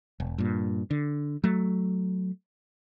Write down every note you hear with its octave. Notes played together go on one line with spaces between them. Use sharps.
E1
G2 A#2
D3
F#3 A3